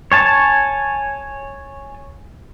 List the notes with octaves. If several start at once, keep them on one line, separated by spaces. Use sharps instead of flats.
C#5 G#5 A5